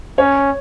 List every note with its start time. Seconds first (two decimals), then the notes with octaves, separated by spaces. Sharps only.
0.18 C#4 C#5